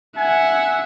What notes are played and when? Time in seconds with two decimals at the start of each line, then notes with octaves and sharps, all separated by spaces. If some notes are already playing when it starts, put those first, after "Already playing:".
0.17 E5 F#5 G#5